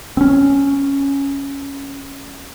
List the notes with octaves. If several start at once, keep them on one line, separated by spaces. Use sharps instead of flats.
C4 C#4